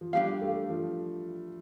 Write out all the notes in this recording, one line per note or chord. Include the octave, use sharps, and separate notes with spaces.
F3
G3 D4 G4 F5
A3
F3